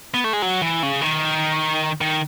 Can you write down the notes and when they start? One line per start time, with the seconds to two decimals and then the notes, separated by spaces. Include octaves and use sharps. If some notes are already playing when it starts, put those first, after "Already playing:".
0.14 B3
0.24 A3
0.33 G#3
0.42 F#3
0.62 E3
0.83 C#3
1.01 D#3
2.01 D#3